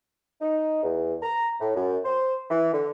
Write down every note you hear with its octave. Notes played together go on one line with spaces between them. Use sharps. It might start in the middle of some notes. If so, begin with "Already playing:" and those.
D#4
E2
A#5
A2
F#2
C5
E3
D3